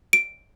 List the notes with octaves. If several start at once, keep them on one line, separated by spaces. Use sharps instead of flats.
D7